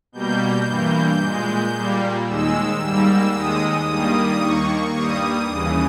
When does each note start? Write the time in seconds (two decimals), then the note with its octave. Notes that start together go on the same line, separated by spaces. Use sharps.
0.12 B2 G3 A#3 G6
0.66 G2 E3 A#3
1.19 A#2 G#3
1.73 A#2 G3 A#3
2.27 D#2 D#3 G#3 E6
2.80 G#2 G3 A#3
3.34 D#2 D#3 G#3 D#6
3.87 G2 D#3 G3 A#3
4.41 D#2 D#3 A#3 C#6
4.94 G2 G3 A#3 D#6
5.48 D#2 C#3 E3